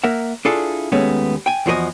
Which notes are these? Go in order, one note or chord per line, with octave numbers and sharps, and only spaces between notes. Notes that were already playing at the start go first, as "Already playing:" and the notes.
A#3 A#4 E5 F#5
D4 E4 F4 G#4 A4
D#2 G#3 A3 B3 C#4
G5 G#5
E2 F3 F#4 G#4 D#5 G#5